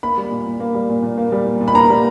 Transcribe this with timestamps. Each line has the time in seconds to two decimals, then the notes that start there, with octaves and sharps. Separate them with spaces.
0.03 A#3 B5
0.17 G3
0.31 A#2
0.46 A#2
0.60 A#3
0.75 G3
0.89 A#2
1.03 A#2
1.18 A#3
1.32 G3
1.46 A#2
1.61 A#2
1.68 B5
1.74 A#3 A#5
1.90 G3